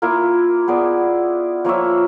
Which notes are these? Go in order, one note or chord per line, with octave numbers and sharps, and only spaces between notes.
A#3 E4 F4 A#4
B3 G#4 D5
F3 A#3 C#5 E5